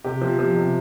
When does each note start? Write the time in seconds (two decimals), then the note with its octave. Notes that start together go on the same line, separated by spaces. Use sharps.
0.04 C3 G4
0.21 F3
0.39 F3
0.56 C3